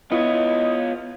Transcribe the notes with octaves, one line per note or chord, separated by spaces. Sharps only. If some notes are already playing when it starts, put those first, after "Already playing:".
B3 E4 F4 C#5 D#5